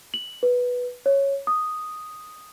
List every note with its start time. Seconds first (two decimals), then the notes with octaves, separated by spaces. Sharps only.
0.14 F#7
0.43 B4
1.06 C#5
1.47 D#6